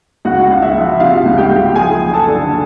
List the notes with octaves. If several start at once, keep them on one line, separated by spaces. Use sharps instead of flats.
C#2 F#4 F#5
C#2 F5
E5
F3
C3 F4 F5
C#2
G4 G5
C#2
F3 G#4 G#5
F#1
A4 A5
D3